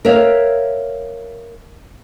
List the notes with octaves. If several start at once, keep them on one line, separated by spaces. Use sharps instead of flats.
A#4 C#5 E5 F5